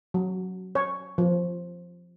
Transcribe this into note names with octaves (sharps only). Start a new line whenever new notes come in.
F#3
C#5
F3